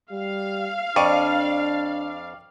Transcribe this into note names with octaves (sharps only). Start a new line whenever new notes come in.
G3 F5
F2 D4 D5 C#6 D#7